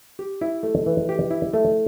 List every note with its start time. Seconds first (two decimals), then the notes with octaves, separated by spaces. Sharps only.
0.19 G4
0.41 E4
0.63 A3
0.86 E3
1.09 G4
1.31 E4
1.54 A3